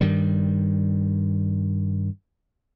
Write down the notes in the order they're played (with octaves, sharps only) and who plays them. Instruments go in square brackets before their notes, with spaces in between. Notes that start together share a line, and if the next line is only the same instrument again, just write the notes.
[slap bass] G2 D#3 G3